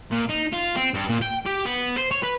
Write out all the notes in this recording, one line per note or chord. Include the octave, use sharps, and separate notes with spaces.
A#2
D#4
F4
C4
G2
A#2
G5
G4
B3
C5
C#5
B4